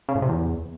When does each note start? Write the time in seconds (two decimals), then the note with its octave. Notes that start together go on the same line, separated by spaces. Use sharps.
0.09 C#3
0.15 A2
0.22 C3
0.29 E2